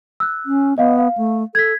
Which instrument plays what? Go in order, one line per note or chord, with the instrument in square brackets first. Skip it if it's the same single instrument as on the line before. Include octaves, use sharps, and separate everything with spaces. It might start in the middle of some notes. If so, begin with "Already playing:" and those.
[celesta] E6 F#6
[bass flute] C#4
[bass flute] B3 [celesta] D#5 F5
[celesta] F5
[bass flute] A3
[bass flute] A4 [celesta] G#6 B6